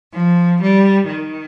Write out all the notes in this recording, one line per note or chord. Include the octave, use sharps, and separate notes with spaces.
F3
G3
D#3